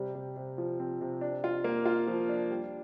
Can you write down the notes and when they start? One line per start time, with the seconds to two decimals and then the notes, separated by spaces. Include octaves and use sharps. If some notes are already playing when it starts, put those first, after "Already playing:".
Already playing: C3 G3
0.15 C3
0.36 C3
0.58 F3
0.80 C4
1.01 C3
1.21 D4
1.44 F4
1.64 A#3
1.86 F4
2.08 F3
2.29 D4
2.51 G3